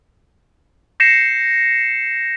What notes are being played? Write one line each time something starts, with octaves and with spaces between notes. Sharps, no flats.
G6 A#6 C7 C#7 E7